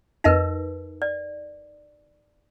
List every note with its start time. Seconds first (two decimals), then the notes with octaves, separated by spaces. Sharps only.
0.24 F2 D#4 A#4 B4 D#5 A#6
1.02 D5